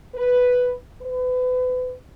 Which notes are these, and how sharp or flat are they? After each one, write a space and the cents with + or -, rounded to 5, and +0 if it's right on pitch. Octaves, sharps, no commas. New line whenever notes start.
B4 +5
B4 +35